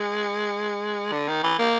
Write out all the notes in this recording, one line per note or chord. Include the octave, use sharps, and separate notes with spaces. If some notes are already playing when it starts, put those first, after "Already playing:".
Already playing: G#3
D3
D#3
E3
A#3